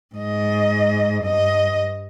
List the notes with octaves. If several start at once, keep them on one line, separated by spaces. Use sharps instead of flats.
G#2 D#5
G2 D#5